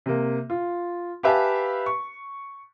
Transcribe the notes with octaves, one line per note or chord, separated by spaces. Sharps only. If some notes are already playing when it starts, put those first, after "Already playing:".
C3 A#3
F4
G4 B4 E5 F5 G#5 A5
C#6